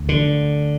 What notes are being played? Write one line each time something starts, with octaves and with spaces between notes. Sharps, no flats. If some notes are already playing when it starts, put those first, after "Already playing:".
Already playing: D2
D3